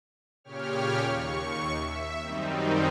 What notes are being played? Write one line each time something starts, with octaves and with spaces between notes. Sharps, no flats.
A#2 C#3 G4 C#5 F6
D#2 C#6
E5
F#2 D#3 G3 C4 D#4